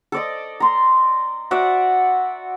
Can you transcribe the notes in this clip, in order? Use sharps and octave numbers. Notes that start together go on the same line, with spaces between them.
A4 D5 D#5
A#5 C6
F#4 D5 E5 F#5